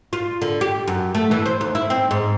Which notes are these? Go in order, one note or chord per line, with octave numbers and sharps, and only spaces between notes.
F4
D3
G4
F#2
A3
E3
C5
D#2
E4
C4
G#2